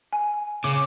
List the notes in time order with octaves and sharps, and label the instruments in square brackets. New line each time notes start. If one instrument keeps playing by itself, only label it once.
[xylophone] G#5
[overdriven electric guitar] C#3 [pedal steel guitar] D6